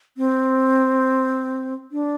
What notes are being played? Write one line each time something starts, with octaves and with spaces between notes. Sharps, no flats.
C4
D4